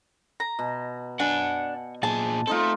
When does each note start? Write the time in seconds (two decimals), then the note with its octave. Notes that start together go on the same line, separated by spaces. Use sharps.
0.40 A#5
0.59 B2
1.20 D4 F#5 G#5
2.03 A#2 G#4 A5
2.47 A3 C4 D#4 F4 A4